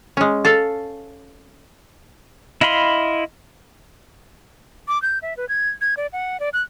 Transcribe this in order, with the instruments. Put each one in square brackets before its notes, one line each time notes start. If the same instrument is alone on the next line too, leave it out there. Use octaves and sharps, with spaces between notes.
[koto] G#3 C#4
A4 F5 A5
[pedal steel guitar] E4 D#5 F5 B5 C6
[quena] D6
G6
E5
B4
G#6
G#6
D5
F#5
D5
F#6